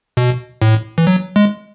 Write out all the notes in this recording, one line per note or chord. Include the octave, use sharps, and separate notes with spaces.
B2
A2
E3
F#3
G#3